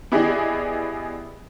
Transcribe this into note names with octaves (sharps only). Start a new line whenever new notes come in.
B3 E4 G4 G#4 D5 D#5